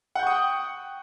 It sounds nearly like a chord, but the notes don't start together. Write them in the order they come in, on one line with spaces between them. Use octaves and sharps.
F#5 G6 C#6 D#6 G5